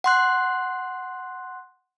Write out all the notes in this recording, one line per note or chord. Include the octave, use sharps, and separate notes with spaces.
F#5 C6 F#6